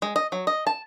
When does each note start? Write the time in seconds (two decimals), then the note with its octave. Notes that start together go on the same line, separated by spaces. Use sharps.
0.02 G#3
0.16 D#5
0.32 F#3
0.47 D#5
0.67 A5